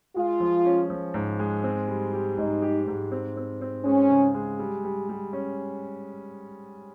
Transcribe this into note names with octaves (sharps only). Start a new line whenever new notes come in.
G#3 F4
F3
C#4
F3
G#2
G#3
C4
G3
G4
G#2 D#4
G4
G#2
C4
C4
C4
G#3 C#4
C#3
G#3
G3
G3
G3
C#4